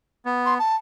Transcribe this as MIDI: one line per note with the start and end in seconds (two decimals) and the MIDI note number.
0.25 0.58 59
0.46 0.54 84
0.59 0.76 81